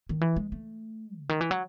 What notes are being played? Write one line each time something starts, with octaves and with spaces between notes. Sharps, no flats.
D#3
E3
G#3
A3
C#3
D#3
E3
F#3